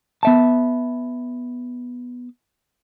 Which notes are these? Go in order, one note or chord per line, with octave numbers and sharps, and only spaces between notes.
B3 E5 A5